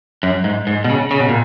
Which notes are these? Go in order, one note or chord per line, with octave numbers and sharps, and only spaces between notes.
F#2
G#2
G#2
B2
C#3
C#3
B2
A#2